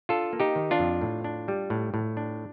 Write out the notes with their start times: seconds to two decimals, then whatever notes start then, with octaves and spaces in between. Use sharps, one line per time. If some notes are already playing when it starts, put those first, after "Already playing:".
0.09 D4 F4 A4
0.33 A#3
0.40 D#4 G4
0.56 D#3
0.71 D4 F4
0.79 F2
1.01 A2
1.24 D4
1.48 G3
1.70 A2
1.94 A2
2.17 D4